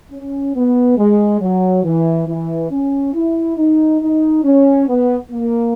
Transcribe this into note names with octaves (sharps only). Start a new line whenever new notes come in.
C#4
B3
G#3
F#3
E3
E3
C#4
E4
D#4
D#4
C#4
B3
A#3